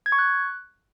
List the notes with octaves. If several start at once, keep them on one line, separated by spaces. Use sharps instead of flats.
G#6
C#6
F#6